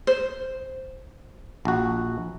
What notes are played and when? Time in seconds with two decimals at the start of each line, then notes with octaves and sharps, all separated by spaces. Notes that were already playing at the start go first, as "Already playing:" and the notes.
0.07 C5
1.65 A#1 F#4